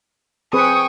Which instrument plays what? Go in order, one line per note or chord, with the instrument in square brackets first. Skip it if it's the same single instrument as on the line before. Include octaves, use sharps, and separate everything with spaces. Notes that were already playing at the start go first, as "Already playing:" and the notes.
[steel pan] C4 G#4 B4 [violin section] G5 G#5 C#6 [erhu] D#6